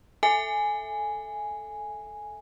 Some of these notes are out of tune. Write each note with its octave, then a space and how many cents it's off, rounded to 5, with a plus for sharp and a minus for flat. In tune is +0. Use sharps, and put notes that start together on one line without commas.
A4 +0 E5 +0 G#5 +0